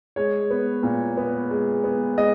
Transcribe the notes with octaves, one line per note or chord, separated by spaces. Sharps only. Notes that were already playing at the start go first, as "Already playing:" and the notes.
G#3 C#5
B3
A#2
B3
G#3
B3
G#3 D#5